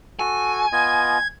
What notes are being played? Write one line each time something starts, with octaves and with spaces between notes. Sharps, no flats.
F#4 A4 G#5
B3 F4 D#5 G#6